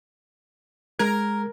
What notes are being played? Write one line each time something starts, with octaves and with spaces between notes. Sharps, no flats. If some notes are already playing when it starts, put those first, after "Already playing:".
G#3 A#4 G#6